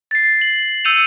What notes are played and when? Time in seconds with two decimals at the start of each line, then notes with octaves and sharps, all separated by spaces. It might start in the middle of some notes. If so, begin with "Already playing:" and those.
0.11 A6 C7
0.41 F#7
0.85 E6 G6 C#7 D#7 F7